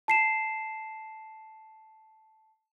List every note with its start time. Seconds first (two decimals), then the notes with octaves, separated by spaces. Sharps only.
0.08 A5 C7 E7